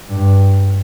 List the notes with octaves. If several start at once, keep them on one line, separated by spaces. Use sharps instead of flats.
G2